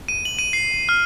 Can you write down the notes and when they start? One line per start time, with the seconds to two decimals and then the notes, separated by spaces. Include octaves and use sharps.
0.08 D#7
0.25 F#7
0.39 D#7
0.53 C7
0.89 F6